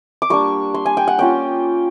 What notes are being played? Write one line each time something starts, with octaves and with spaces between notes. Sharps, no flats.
D6
G3 A#3 D4 C#6
C6
G#5
G5
F#5
A#3 C#4 F4 G5